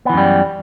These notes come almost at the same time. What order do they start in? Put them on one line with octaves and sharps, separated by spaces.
B3 E3 F#2 G3